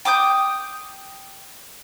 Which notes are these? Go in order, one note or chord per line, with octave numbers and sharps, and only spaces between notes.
G5 D6 D#6 G6